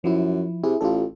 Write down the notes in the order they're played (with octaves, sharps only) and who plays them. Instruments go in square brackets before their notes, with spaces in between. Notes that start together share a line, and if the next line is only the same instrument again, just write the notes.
[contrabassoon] F#2 [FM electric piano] F3 E4
[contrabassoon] C3 [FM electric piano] E4 G#4
[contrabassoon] A1 [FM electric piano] F4 G4 A4